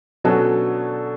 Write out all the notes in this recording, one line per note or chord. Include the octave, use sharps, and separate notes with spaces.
B2 D3 F#3 C#4 F#4 A4